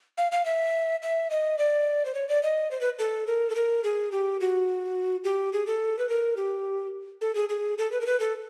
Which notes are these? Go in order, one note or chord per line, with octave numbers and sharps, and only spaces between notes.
F5
F5
E5
E5
D#5
D5
C5
C#5
D5
D#5
C5
B4
A4
A#4
A4
A#4
G#4
G4
F#4
G4
G#4
A4
B4
A#4
G4
A4
G#4
G#4
A4
B4
A#4
B4
A4